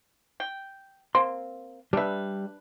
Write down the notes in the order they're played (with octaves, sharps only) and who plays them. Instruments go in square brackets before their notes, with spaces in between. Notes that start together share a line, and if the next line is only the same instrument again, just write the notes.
[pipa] G5
[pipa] A#3 C4 [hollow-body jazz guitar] C6
[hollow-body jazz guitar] G3 E5 [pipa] D4 B4